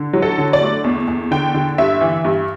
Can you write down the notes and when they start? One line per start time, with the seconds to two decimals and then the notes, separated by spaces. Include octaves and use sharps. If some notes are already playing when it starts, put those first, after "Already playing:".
Already playing: D3
0.13 F#3
0.22 A4
0.38 D3
0.53 D5
0.61 A3
0.84 E2
1.08 E2
1.31 D3 G5
1.54 D3
1.78 G2 E5
2.01 E3
2.25 G2